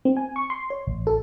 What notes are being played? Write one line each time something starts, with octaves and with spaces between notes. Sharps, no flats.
C4
G#5
C#6
C6
C#5
A1
A4